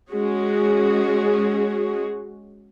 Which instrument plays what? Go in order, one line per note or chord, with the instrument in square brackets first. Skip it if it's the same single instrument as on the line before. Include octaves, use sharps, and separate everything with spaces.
[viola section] G#3 C#4 F#4 G#4